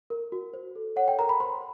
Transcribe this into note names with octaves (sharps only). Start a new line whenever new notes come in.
A#4
F#4
C5
A4
C#5 F#5
G5
A#4 A#5
B5
C5 C6